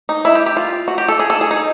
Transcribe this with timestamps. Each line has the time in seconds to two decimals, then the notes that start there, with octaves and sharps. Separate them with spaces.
0.09 D#4
0.25 E4
0.35 G4
0.46 G4
0.57 F4
0.88 F#4
0.98 G4
1.09 A4
1.19 G#4
1.30 A4
1.41 G#4
1.51 D#4